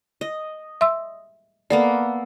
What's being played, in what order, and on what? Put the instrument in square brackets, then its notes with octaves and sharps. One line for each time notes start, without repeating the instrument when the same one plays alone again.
[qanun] D#5
[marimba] E5 C6 E6
[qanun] A#3 B3 A4 [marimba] D5